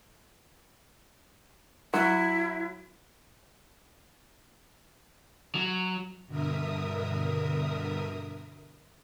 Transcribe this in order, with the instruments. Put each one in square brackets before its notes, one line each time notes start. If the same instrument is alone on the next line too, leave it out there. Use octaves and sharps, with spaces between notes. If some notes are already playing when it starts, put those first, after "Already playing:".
[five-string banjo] F#3 [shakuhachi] E4
[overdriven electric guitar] F#3
[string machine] G2 B2 D3 A#4 E5 D#6